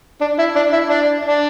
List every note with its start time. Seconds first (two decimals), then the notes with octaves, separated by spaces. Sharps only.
0.21 D4
0.39 E4
0.56 D4
0.73 E4
0.90 D4
1.25 D4